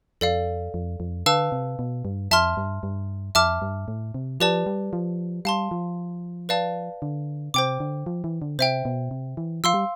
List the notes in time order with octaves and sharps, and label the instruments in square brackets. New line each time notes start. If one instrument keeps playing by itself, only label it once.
[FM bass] F2 [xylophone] A4 D5 F5
[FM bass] F2
F2
[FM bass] D3 [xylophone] B4 F5 A5 E6
[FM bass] C3
B2
G2
[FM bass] F2 [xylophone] E5 A5 C6 F6
[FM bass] G2
G2
[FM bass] F2 [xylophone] E5 A5 D6 F6
[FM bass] G2
A2
C3
[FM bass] F3 [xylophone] G4 B4 D5 A5
[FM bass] G3
F3
[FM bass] G3 [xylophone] F5 A5 C6
[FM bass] F3
[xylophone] B4 D5 F5 A5
[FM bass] D3
[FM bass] C3 [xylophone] C5 G5 D6
[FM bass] D3
F3
E3
D3
[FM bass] C3 [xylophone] C5 E5 G5
[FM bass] B2
C3
E3
[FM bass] F3 [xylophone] F5 C6 E6
[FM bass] G3